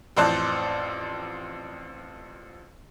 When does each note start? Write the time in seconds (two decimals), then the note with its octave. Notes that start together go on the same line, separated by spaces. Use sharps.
0.17 A1 F2 C5 D5 A5 F#6